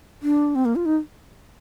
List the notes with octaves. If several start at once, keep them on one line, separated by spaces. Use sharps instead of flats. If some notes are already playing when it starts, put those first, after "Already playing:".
D4
C4
A#3
F4
D#4